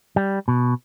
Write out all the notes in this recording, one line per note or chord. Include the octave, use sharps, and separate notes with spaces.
G3
B2